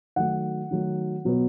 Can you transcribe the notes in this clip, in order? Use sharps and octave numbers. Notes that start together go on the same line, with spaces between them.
D#3 F#3 A3 F#5
D#3 F#3 A3
B2 F#3 B3